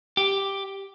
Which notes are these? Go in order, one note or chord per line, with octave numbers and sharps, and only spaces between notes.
G4